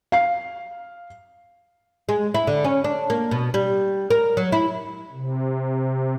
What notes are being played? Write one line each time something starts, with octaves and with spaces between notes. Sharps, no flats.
F5 C7
G#3
E4
D3
C#4
D4
A#3
B2
G3
A#4
F#3
E4
C3